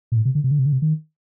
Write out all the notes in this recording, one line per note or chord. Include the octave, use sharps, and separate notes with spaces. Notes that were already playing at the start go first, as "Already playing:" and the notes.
A#2
A2
C3
D3
C3
D3
C3
D3
C3
D#3